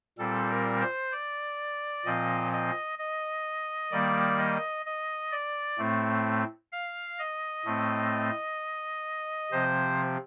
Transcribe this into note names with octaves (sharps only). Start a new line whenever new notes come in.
A#2 G3 C4 A4
A#4
C5
D5
A#2 F3 C4 D#5
D#5
D#5
D#3 G3 A#3 D5
D#5
D#5
D5
A2 A3 C4
F5
D#5
A2 A3 C4
C3 F3 C4 C5